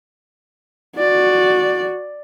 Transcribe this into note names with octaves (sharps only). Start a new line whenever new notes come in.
F#4 D5